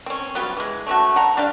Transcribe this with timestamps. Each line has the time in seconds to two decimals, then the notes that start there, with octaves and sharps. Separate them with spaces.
0.06 C4 C#4
0.35 F#3 G3 B3 F4
0.57 E3 G#3
0.87 A3 C#4 F#4
1.16 F#5 A#5
1.37 G3 D4 G4 F5